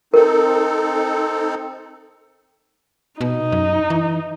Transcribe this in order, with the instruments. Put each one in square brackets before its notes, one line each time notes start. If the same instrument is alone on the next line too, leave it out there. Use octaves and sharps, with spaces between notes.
[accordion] C4 D#4 A4 [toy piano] A#4
[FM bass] B2 [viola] D#4
[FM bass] F#2
E3